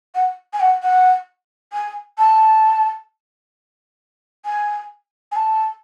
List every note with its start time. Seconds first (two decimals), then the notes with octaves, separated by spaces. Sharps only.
0.15 F#5
0.53 G#5
0.60 F#5
0.83 F#5
1.73 G#5
2.18 A5
4.45 G#5
5.32 G#5
5.36 A5